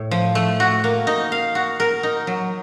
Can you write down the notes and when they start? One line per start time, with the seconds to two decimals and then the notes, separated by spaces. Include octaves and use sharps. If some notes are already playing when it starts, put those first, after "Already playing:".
Already playing: A2
0.11 F3
0.35 A3
0.60 F#4
0.84 A#3
1.07 D#4
1.32 F5
1.55 F#4
1.80 A#4
2.03 D#4
2.27 F#3